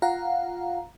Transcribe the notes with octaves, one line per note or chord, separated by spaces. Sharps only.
F4 F5 F#5 A#5